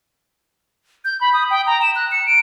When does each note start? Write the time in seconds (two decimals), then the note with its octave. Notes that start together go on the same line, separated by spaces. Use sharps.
1.05 G6
1.21 B5
1.33 D#6
1.50 G5
1.66 A#5
1.82 E7
1.95 F#6
2.12 C#7
2.26 D7